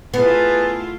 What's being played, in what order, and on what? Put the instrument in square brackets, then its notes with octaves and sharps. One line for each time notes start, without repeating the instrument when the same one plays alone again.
[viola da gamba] A3 E4 F4 [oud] B3 [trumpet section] G#4 B4 A5